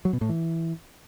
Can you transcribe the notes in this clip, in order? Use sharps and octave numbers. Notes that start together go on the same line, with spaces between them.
F#3
B2
A2
E3